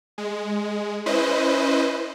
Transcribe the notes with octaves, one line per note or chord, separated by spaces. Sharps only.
G#3
C#4 E4 B4 C5 D#5